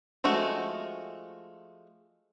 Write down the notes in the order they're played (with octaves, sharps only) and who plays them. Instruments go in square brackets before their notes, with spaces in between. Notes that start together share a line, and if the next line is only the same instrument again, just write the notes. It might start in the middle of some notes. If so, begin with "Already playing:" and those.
[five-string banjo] F3 G#3 A3 F#4